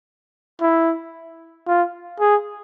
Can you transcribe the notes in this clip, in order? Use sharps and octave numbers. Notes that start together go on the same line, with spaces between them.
E4
F4
G#4